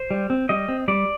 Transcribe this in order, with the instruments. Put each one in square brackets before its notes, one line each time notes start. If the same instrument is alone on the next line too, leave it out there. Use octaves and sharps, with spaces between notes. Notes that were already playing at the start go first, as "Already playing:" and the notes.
Already playing: [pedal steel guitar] C5
G3
C4
G3 D#5
C4
G3 D5